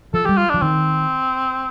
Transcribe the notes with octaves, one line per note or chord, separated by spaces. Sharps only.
F3 A4
G3 G4
F4
F3 D4
D#3 C4